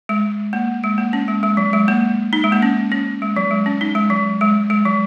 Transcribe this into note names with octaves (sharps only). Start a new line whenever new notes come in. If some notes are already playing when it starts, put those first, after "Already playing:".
G#3
A#3
G#3
A#3
C#4
G#3
G#3
F#3
G#3
A#3
D#4
G#3
A#3
C#4
C#4
G#3
F#3
G#3
C#4
D#4
G#3
F#3
G#3
G#3
F#3